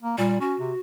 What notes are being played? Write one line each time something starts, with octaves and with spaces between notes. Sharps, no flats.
A#3
A#2 G3
C#4 F#4
C3